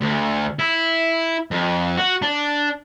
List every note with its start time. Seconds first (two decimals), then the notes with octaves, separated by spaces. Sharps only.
0.01 D2
0.59 E4
1.51 F2
1.97 F#4
2.22 D4